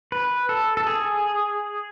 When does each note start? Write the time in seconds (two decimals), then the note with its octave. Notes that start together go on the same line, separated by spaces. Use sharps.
0.12 B4
0.49 A4
0.77 A4
0.87 G#4